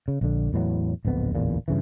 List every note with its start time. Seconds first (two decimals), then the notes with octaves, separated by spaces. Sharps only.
0.08 C#3
0.21 A#1 D3
0.53 E2 A2 E3 F#3
1.05 D1 A#1 F2 B3
1.35 D1 A1 E2 A#2
1.68 G2 C#3 E3